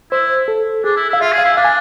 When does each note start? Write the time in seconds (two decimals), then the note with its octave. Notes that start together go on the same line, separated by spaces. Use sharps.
0.11 E4 C5
0.48 A4
0.84 D4 G#4
0.96 E4
1.09 E4
1.13 F5
1.21 F4 E5
1.32 G#4
1.38 F5
1.44 E4
1.57 D4 F5
1.65 G#5